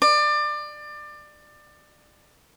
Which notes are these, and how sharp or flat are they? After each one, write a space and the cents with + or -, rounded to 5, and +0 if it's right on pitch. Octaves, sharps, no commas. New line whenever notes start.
D5 +25